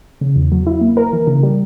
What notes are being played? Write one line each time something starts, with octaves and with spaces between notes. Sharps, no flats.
C#3
E2
F#3
E4
A#3
A#4
E3
C#3
G3